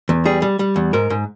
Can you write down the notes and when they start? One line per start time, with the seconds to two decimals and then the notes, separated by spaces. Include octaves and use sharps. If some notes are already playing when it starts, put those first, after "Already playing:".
0.09 E2
0.25 G3 G#4
0.42 G3
0.59 G3
0.76 E2
0.93 G#2 A#4
1.10 G#2